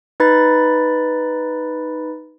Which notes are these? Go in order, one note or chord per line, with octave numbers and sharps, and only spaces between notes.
D#4 B4 B5 A6